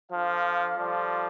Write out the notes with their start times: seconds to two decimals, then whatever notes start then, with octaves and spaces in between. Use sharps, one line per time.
0.12 F3 D4 A4 F5
0.77 F3 G3 F4 A4 D5